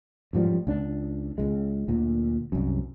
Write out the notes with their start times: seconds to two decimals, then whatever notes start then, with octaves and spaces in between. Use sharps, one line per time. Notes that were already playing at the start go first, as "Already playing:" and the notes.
0.33 A1 G#2 F3 G3
0.67 C#2 D4
1.38 C#2 G#3
1.88 D2 A#2
2.52 C2 F#2